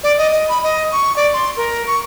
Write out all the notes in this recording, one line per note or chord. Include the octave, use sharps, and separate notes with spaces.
D5
D#5
D#5
B5
D#5
C#6
D5
C6
A#4
C#6